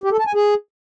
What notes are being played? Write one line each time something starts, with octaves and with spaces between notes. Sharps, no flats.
G4
A4
A5
G#5
G#4